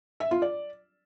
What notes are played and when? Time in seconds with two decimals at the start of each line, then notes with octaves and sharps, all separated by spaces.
0.20 E5
0.31 F4
0.42 D5